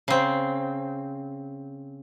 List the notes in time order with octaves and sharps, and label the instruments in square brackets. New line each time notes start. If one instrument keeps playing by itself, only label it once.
[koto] C#3 C4